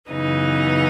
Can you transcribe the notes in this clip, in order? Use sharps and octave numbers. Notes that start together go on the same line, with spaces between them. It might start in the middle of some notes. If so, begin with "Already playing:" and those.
F#2 C#3 E3 B3 D#4